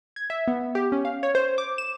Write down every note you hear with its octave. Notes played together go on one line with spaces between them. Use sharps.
G#6
E5
B3
G4
C#4
F5
C#5
C5
D6
E7